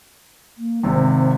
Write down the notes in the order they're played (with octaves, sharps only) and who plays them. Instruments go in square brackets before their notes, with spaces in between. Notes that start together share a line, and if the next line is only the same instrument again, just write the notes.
[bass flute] A#3
[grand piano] G#1 C3 [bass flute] C4